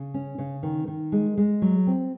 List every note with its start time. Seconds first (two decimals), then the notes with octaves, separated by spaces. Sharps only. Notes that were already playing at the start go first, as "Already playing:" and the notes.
Already playing: C#3
0.14 C#4
0.38 C#3
0.63 D#3
0.88 D#3
1.12 G#3
1.37 G#3
1.62 F#3
1.87 C4